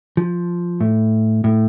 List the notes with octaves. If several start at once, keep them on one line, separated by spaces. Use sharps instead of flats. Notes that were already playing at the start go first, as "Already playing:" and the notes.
F3
A2
A2